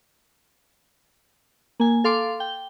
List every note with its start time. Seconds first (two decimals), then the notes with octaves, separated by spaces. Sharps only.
1.80 A#3 G#5
2.04 A4 F5 C6 D6
2.40 G5